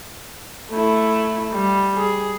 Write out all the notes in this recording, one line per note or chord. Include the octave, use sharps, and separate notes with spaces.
A3 E4
G3
G#4